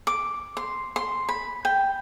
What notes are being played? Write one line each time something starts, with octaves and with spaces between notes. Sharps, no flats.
D6
C6
C6
B5
G5